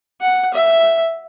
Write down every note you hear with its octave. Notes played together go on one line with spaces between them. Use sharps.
F#5
E5